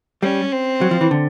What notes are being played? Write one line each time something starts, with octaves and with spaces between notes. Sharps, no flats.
G3 C#4
C4
F#3
F3
E3
D3